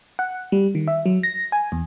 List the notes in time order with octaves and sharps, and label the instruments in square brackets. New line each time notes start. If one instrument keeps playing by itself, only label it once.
[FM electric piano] F#5
G3
D#3
E5
F#3
A#6
G#5
E2